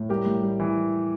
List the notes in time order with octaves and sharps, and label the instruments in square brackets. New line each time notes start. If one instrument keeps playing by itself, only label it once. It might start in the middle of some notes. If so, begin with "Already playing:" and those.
Already playing: [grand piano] A2
G3 G4 A#4
A2
G3
E3